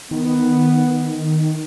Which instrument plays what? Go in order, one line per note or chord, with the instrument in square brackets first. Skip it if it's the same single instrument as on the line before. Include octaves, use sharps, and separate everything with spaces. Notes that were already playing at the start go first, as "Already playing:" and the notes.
[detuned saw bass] D#3 [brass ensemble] B3